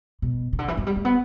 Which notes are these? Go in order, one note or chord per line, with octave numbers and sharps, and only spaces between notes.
B2
C#3
D3
E3
F#3
G3
A3
B3